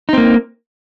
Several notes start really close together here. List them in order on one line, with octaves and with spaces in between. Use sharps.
D#4 C4 A#3